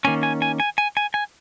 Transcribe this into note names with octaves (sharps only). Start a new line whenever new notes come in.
D#3 A#3 C#4 G#5
G#5
G#5
G#5
G#5
G#5
G#5